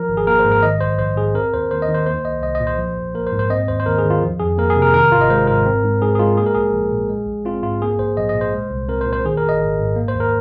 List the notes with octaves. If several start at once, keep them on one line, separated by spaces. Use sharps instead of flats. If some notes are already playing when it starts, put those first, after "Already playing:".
Already playing: F3 A#4
G#1
G#4
A#3 A#4
C5
G#2
A#4
D#3 D#5
A#1 C5
A#1 C5
G#2 G#4
C4 A#4
D#2 C5
D#2 C5
D#5
D#3
C5
A#3 C5
C2 D#5
C2 D#5
D#5
A#2
C5
F3
A#1
A#3 A#4
C5
G#2
C5
C4 D#5
D#2 C5
C5
D#2 A#4
G#4
D#3
F4
F3
F2 G#4
A#3 A#4
G#4
C3
A#4
D#3 A#4
G#1 F4
D#5
G#3 C5
G#2 A#4
C4
G#2
G#2 G#4
G#4
G#3 F4
A#3 G#4
A#4
A#1 G#4
A#1
A#2
G#3
A#1
C4 F4
G#2 F4
A#3 G#4
A#1 C5
A#1 D#5
D#5
A#2
C5
G#3
C2
C4 A#4
C5
A#2
C5
D#3 G#4
A#4
G#1
D#5
G#1
G#2
A#3
C5
D#2
A#4